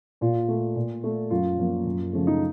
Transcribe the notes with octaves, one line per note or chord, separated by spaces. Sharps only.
A#2 F4
A3
A#2
A3
F#2 F4
F3 A#3
F#2
C#3 F3 A3
D#4